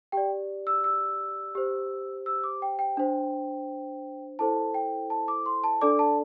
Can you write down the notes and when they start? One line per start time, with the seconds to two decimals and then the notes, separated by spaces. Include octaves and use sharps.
0.12 G4 D5 G5
0.67 E6
0.84 E6
1.55 G4 C5
2.26 E6
2.44 D6
2.62 G5
2.79 G5
2.97 D4 C5
4.39 E4 A4 C5 A5
4.74 G5
5.10 A5
5.28 D6
5.46 C6
5.64 A5
5.81 D4 A4 D5 D6
5.99 A5